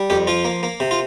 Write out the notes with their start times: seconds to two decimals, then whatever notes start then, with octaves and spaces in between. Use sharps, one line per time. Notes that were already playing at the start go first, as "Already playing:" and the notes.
Already playing: G3
0.10 F2 G4
0.27 F3 F4
0.45 A#3
0.63 A#3
0.80 C3
0.91 F4